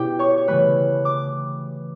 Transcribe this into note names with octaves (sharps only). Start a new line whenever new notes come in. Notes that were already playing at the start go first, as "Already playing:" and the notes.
Already playing: B2 C#4 E4 G4 G5
C#5 C#6
C#6
C#3 E3 A3 B4 B5
D6